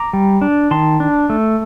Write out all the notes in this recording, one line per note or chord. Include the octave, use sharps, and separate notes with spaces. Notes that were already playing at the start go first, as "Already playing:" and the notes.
Already playing: A#5 D6
G3
D4
D#3 A5 C6
D4
A3